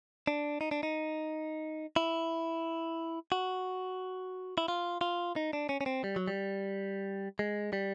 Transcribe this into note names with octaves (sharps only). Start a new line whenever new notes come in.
D4
D#4
D4
D#4
E4
F#4
E4
F4
F4
D#4
D4
C#4
C#4
C4
G3
F#3
G3
G#3
G3